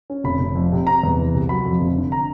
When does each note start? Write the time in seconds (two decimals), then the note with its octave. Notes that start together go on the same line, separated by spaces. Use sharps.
0.10 C#4
0.24 F1 B5
0.40 F1
0.55 F2
0.72 C3
0.87 C3 A#5
1.03 E2
1.18 E3
1.34 C2
1.49 F#3 B5
1.65 F2
1.81 F1
1.97 D3
2.12 A#5